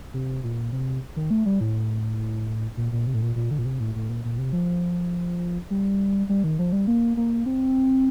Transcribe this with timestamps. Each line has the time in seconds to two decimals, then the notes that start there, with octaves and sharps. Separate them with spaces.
0.14 C3
0.43 A#2
0.72 C3
1.16 D#3
1.30 A3
1.46 G3
1.60 A2
2.77 A#2
2.92 A#2
3.07 C3
3.14 A2
3.22 A#2
3.36 A#2
3.51 D3
3.58 A#2
3.65 C3
3.80 A2
3.95 A2
4.09 A#2
4.24 A#2
4.38 C3
4.53 F3
5.70 G3
6.29 G3
6.44 D#3
6.59 F3
6.72 G3
6.87 A#3
7.17 A#3
7.46 C4